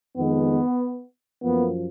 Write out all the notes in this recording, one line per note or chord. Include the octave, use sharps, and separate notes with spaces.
F2 D#3 G#3 B3
F#2 F3 A#3 B3